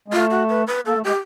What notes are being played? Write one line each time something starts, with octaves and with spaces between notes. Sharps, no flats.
G#3
A3 F4
F#4
B4
B4
A#3 A4
A3
G#3 G4